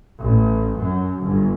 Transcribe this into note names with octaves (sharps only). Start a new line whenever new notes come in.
A1
F#2
G1